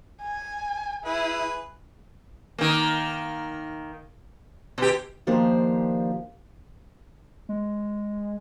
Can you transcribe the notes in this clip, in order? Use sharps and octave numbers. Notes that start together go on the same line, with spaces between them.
G#5
E4 G#4 B4
D#3 A#3
B2 G4
D#3 F3 A#3 D4 G4 C5
G#3